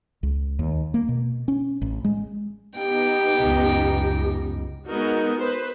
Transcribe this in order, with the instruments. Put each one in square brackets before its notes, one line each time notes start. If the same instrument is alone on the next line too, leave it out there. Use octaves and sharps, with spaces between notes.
[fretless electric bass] C#2
D#2
A#3
B2
C#4
A1
G#3
[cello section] B3 D#4 [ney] G4 [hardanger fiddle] G5
[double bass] C#2 F#2
[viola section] G#3 B3 D#4 F#4 A#4
B4 C5